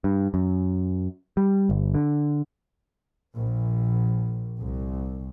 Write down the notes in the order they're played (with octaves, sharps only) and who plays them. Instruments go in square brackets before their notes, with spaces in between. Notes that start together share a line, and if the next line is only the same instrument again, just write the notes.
[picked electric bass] G2
F#2
G3
G1
D3
[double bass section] A#1
C2